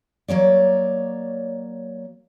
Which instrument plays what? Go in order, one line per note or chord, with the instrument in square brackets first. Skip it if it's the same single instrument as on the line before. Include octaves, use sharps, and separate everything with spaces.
[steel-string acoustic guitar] F#3 A#3 C#5 D5